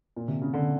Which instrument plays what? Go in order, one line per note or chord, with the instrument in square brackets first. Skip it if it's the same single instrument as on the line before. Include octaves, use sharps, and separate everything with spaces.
[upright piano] A#2
C3
C#3
D3